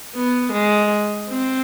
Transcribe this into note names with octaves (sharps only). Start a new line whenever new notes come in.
B3
G#3
C4